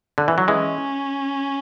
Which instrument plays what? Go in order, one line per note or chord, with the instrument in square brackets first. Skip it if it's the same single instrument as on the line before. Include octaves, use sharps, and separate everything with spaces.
[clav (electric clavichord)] D3
E3
F#3
[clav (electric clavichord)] E3 G#3 [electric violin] C#4